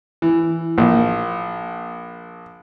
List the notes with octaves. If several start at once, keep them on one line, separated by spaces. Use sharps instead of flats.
E3
A#1